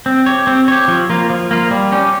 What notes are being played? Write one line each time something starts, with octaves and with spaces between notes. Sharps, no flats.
C4
G4 C#5
C4
G4 C#5
F3
A#3 F4
F3
A#3 F4
G3
C#4 G4